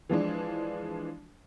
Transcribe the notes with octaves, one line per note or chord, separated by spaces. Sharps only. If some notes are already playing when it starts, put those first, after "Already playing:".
E3 F3 G#3 D4